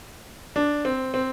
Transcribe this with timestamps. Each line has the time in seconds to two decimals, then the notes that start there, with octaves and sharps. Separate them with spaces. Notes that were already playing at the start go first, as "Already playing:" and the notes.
0.56 D4
0.85 C4
1.14 C4